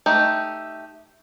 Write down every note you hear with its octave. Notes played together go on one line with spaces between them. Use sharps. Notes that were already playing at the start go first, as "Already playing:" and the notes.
A3 D#4 G4